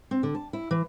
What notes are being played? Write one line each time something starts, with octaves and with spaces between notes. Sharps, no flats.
C4
D3
A5
E4
E3